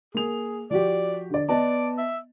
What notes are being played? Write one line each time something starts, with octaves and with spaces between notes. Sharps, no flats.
A#3 G#4 F7
F3 F#4 G4 D5
D3 D5
B3 D5 D#5 A5
E5